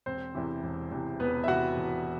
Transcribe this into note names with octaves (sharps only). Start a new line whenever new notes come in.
E1 C4 C5
E2 C3 E3
E1
E2 C3 E3
E1 B3 B4
E5
E2 C3 E3 F#4 F#5
E1